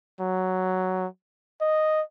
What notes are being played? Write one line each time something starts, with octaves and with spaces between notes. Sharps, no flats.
F#3
D#5